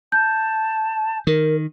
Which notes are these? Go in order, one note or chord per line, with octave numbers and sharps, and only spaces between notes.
A5 G6
D#3 A#4